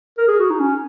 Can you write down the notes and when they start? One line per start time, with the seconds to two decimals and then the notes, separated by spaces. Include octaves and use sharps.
0.18 A#4
0.28 G#4
0.40 F#4
0.50 D#4
0.60 C#4